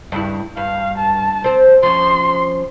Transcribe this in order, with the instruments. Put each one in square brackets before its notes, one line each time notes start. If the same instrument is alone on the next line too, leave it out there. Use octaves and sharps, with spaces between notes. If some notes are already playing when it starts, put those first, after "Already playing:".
[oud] G2 C#3 E4
[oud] G2 [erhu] F5
[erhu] A5
[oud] C4 C5
[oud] F3 C#4 [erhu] C6